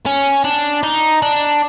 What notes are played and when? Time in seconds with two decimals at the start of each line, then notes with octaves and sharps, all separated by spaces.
0.06 C#4
0.45 D4
0.83 D#4
1.22 D4